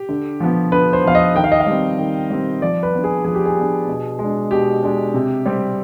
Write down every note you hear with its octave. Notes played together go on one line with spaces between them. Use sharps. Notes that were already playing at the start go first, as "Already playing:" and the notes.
Already playing: G4
D3
F3 B3
D3 B4
C5
F3 B3 F5
D#5
D#3 G5
F5
D#5
F5
G3 C4
D#3
G3 C4
F3 D5
B4
B3 D4
G#4
F3 G#4
G4
G#4
B3 D4
B2
G#3
D4
B2 G4
G#3 D4
C3
G3 C4